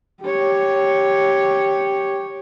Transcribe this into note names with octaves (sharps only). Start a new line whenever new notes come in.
G4 C#5